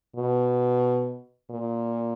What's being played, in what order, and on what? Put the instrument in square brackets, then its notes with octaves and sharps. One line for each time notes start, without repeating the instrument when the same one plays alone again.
[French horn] B2
A#2